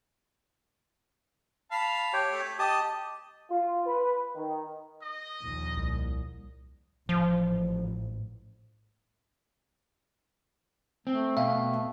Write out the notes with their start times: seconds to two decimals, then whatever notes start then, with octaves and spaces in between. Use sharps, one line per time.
1.71 F5 A5 B5
2.13 G4 C#5 G5
2.32 A3
2.59 G4 D#5 A5 D#6
3.50 F4
3.86 B4
4.35 D#3
5.02 D#5
5.42 A#1 D#2
5.77 C2
7.09 A1 F3
11.07 A3 C4
11.37 B2 E5 F5 G5